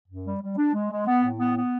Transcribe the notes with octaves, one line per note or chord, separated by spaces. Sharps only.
F#2
G3
G3
D4
G#3
G#3
B3
A2
B3
B3